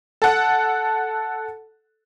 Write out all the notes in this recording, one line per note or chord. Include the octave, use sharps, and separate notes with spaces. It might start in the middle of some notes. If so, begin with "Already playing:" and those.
A4 F#5